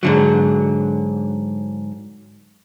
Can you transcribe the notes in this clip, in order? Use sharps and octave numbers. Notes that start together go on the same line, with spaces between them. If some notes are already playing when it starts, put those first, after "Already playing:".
G#2 D3 F#3